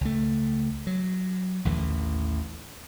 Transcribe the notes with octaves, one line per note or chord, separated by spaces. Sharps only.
C#2 A3
F#3
A1 D#2 D3 E3